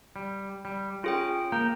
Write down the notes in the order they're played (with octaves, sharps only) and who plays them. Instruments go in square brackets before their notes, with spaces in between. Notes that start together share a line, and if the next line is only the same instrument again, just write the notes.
[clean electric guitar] G3
G3
[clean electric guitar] C#4 [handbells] F4 G#4 G5
[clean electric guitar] A#3 G5 [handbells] A#5